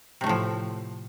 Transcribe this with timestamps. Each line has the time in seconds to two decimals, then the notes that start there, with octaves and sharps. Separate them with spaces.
0.21 C3
0.24 A3
0.27 A2
0.29 F3